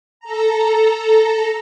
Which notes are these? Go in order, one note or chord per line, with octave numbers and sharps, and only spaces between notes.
A4 A#5